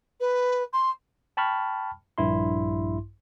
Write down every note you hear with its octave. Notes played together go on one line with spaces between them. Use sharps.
B4
C6
G5 A5 B5 C#6 F6
A#1 G2 E4 C6